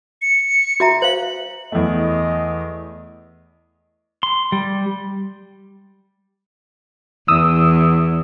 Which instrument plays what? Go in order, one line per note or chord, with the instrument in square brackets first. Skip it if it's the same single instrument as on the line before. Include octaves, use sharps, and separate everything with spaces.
[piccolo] C#7
[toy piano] F#4 E5 A#5
[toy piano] C5 F5 [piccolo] F#7
[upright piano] E2 A3 [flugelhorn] D#5
[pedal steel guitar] C6
G3
[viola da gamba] E2 [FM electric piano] D#6 E6